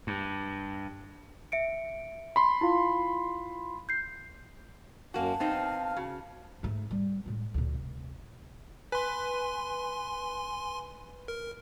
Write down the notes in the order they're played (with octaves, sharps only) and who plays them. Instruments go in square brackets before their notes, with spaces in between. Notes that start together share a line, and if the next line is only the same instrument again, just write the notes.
[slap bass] G2
[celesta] E5 C#7 D7
[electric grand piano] B5 C6
[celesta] E4 F4 F5
G6 C7
[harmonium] F#2 [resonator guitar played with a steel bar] A#3 F#4 [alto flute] A5
[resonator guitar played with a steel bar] B3 C4 D#4 [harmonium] F5
[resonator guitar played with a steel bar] C#3 [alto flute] F#4
[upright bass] G#2 A3
G3
A2 G#3
D2 A#2
F1
[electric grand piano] B4 [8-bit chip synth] G#5 C6
[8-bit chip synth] A#4